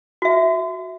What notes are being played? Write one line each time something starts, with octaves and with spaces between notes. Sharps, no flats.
F#4 E5